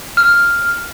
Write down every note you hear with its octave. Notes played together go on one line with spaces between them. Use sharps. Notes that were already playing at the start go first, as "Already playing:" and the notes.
F6